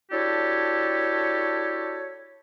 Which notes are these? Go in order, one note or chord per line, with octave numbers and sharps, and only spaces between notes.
D4 E4 F#4 G4 A4 C#5